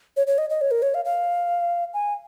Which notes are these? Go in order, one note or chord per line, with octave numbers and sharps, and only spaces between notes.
C#5
C#5
D#5
D#5
C#5
A#4
C#5
F5
F5
G#5